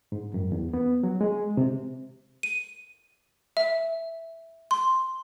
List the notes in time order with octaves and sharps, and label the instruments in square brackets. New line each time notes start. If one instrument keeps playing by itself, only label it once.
[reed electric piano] G#2
F#2
E2
B3
F#3
G#3
C3
[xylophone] D#7
E5
C6